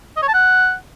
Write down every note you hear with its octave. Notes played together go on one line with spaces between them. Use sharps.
D#5
C#5
A5
F#5